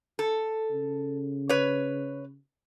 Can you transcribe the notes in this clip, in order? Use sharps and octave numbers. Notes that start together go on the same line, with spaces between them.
A4
C#3
B4 C#5